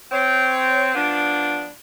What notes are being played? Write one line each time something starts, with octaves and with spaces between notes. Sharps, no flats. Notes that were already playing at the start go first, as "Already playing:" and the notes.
C4 C#5
F3 B3 D4